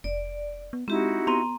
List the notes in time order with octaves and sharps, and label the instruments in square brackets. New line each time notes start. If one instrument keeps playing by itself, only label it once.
[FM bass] F1 [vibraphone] D5
[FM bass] B3
[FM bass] G#3 [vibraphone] C4 G4 [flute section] D#4 E4 F#4
[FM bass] B3 [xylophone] A#5 C6 D#7